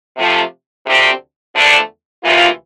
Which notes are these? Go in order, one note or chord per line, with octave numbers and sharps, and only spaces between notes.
C3 F3 A3
D2 C3 F3 C4 G4
E2 D3 F3 A3 D4
D2 C3 E3 A#3 F4